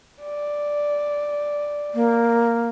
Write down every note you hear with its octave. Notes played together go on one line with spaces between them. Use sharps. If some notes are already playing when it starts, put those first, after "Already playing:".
D5
A#3